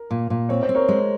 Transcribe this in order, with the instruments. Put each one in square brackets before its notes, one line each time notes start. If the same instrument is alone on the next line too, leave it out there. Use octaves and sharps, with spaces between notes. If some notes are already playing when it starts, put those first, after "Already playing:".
Already playing: [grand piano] A#4
[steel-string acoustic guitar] A#2
A#2
[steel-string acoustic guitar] C4 [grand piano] C#5
[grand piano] C5
[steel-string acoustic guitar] C4
[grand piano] A#4 C#5
[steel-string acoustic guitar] G#3